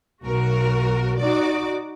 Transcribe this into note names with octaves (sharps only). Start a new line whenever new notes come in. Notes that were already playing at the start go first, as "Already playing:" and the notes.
B1 F#4 A#4
D#4 F#4 D5 D6